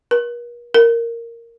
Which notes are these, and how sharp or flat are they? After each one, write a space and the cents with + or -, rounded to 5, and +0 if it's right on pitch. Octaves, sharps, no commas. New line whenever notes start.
A#4 +45
A#4 -10